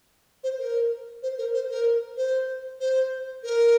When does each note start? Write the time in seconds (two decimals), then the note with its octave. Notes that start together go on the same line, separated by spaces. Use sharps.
0.44 C5
0.59 A#4
1.23 C5
1.38 A#4
1.54 C5
1.70 A#4
2.17 C5
2.80 C5
3.44 A#4